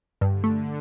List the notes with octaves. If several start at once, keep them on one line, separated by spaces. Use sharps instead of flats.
G2 D3
A3